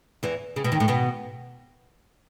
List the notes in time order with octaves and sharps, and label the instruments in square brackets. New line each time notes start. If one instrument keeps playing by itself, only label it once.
[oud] E2 E3
C#3
B2
D#2 D#3
A2 A3
B2 B3